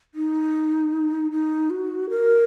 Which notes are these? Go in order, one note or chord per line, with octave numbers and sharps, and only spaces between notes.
D#4
D#4
F#4
A#4